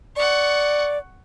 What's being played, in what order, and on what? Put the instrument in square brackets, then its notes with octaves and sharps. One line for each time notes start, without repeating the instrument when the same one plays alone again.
[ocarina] D5 [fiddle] F#5 C#6